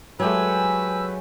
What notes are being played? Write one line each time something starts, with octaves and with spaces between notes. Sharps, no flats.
F#3 G#3 A3 G4 B4 G#5 E6